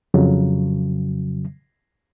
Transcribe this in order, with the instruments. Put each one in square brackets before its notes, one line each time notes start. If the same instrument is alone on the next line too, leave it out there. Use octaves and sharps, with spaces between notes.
[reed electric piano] F2 C#3 F#3